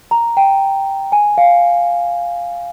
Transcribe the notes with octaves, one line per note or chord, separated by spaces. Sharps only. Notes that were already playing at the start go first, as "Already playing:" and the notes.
A#5
G5
G#5
F5